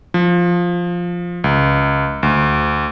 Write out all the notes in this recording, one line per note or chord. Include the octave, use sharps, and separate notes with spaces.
F3
C#2
D2